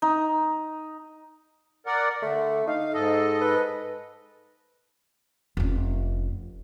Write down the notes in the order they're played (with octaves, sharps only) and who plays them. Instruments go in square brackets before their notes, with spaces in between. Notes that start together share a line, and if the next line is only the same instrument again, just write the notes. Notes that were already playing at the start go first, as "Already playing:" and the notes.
[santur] D#4
[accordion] A#4 D5 F#5
[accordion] D3 [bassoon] A3
[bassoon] D#4 [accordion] F5
[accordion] G#2 A4 D#5
[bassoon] B4
[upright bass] F1 C#4